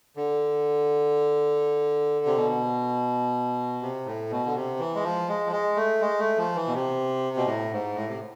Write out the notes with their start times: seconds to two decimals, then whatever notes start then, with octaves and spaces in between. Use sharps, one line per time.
0.17 D3
2.26 C3
2.36 B2
3.82 C3
4.06 A2
4.31 B2
4.46 D3
4.55 C3
4.80 E3
4.95 G#3
5.04 F3
5.28 G#3
5.47 F3
5.52 G#3
5.76 A3
6.01 G#3
6.19 A3
6.38 F3
6.55 E3
6.67 B2
6.74 C3
7.37 B2
7.46 A2
7.72 G#2
7.95 A2
8.09 C3